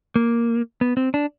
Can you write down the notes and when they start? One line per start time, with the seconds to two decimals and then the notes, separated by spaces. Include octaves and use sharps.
0.16 A#3
0.81 B3
0.97 C4
1.14 D4